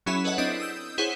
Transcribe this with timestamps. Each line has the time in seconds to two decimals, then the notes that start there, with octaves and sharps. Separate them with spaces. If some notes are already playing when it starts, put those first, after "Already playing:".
0.06 F#3 C#4 E4 G#4 E5 B5
0.24 A4 B4 C#5 D#5 E5 F#5
0.38 C4 D4 E4 D#5 D#6 G6
0.60 D#6 E6 G6
0.98 E4 G#4 C5 C#5 F#5